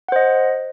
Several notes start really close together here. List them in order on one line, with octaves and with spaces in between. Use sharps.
F#5 C5 D#5